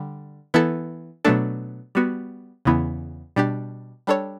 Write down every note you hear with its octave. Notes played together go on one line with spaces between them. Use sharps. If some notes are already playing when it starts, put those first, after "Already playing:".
Already playing: D3 G3
E3 B3 E4 A4
B2 F#3 A3 D4 A4
G3 B3 F#4
E2 C#3 E3 B3 E4
B2 G3 D4 G4
G3 D4 A4 C#5